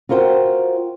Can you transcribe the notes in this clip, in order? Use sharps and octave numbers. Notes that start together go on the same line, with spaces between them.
F4 F#4 A#4 C5 G5